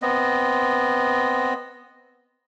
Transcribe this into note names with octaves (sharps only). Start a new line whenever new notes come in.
B3 C4 D#5